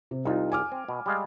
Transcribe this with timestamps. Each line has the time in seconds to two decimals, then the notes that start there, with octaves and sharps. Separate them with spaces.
0.11 C3
0.25 C2 D#4 F4
0.52 G#5 D6 F6
0.72 C4
0.89 B2
1.06 G3 G#3 F5